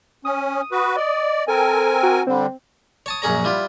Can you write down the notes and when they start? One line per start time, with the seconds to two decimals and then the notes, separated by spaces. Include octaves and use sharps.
0.25 C#4 D#6
0.72 F#4 B4
0.96 D5 D#5
1.48 C4 A4 A#4 G#5
2.03 F#4
2.27 D3 G3 C4
3.06 C#5 A5 D#6
3.22 A#1 F#2 C#4 G#4 C#5 A#5
3.44 G3 E4 F4